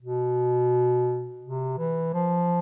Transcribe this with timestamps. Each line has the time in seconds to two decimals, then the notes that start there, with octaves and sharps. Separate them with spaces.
0.02 B2
1.43 C3
1.78 E3
2.14 F3